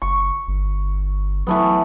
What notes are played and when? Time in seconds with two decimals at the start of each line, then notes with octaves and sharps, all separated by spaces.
0.02 F#1 C#6
0.48 G1
1.47 E3 F#3 A3 B3